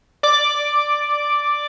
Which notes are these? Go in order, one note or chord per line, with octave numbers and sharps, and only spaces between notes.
D5 D6